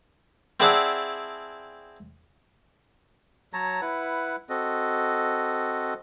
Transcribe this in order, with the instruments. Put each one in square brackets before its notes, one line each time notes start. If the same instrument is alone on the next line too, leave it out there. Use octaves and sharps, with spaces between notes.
[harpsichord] C4 E4 G#4 D5 F#5 A5
[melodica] F#3 C#5 A5 A#5
E4 B4 F#5
C4 F#4 A4 D#5